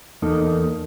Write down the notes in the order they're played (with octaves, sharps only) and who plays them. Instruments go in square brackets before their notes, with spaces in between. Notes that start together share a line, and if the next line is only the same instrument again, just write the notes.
[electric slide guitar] E2 A#3 D#4 A4